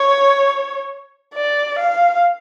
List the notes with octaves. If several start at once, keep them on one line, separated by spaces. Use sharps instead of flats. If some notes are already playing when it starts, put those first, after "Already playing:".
Already playing: C#5
D5
F5